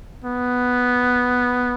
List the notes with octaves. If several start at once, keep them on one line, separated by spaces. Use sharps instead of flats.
B3